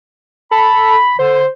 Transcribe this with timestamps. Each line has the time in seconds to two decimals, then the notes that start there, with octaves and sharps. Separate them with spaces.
0.51 A4 B5
1.19 D3 C5